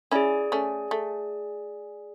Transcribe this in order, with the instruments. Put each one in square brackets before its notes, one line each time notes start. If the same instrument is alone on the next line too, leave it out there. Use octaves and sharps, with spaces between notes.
[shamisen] C#4 E4 [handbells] G#4 D5 G#5
[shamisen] A3 C#4
A3